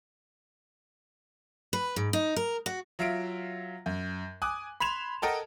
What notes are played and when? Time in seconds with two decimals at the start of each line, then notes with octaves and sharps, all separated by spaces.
1.73 B4
1.96 G#2
2.13 D#4
2.36 A#4
2.66 F#4
2.99 F#3 F4 E5 F5 D7
3.86 F#2
4.42 G#5 D6 D#6 F#6
4.80 B5 C6 G#6 E7 F7
5.22 A4 A#4 D#5 F#5 G5 A5